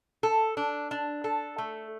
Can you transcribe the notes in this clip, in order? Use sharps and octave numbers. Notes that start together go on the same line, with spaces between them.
A4
D4
D4
A4
A3